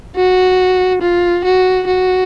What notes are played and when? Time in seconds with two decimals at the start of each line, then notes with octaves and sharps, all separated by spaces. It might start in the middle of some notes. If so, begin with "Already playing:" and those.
0.16 F#4
1.02 F4
1.44 F#4
1.87 F#4